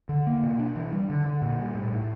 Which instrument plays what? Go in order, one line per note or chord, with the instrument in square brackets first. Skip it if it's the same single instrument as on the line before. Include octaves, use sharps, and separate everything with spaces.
[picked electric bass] D3
A#3
B2
D4
E3
G3
D3
D3
A#2
G3
A2
A2